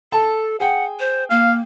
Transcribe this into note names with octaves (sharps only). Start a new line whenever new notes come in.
A4 A5
G#4 F#5 G5
C5
A#3 F5